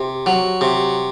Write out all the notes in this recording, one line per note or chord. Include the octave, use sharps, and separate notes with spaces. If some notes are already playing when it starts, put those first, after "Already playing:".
Already playing: C3
F#3
C3